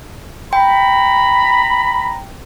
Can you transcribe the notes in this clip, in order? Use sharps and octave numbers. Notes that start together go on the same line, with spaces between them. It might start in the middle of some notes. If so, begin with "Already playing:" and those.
G5 A#5 B5